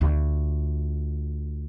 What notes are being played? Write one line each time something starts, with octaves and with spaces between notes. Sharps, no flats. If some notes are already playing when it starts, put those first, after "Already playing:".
D2 F4